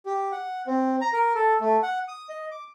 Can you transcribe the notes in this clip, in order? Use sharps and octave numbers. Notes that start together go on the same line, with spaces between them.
G4
F#5
C4
A#5
A#4
A4
A3
F#5
D#6
D#5
D6